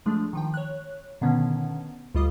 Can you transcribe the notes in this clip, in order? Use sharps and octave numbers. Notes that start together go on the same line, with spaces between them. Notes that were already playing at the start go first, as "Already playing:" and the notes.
F3 G#3 A3 D4
D#3 F3 G5
C#5 F#6
B2 D3 D#3 B3 C#4
D2 G3 F4 D#5 D#6